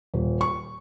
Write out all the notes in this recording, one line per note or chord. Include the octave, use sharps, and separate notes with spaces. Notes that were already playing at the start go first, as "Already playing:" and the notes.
D#1
C#6